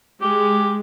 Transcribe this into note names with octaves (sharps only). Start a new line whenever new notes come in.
G#3 G4